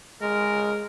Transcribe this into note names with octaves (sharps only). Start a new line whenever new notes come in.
G#3 A#4